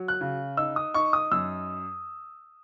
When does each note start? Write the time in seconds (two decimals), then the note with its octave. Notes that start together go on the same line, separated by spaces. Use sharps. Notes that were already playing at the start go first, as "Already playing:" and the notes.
Already playing: F#3
0.08 F#6
0.21 C#3
0.57 D#4 E6
0.76 D#6
0.94 D#4 C#6
1.13 D#6
1.32 F#2 E6